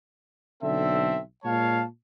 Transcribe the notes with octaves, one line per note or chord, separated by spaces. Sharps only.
B1 D3 C4 A4 E5
A#2 G#3 C#5 F5 A5